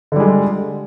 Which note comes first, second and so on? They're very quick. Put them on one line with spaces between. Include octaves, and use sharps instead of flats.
D3 G3 G#3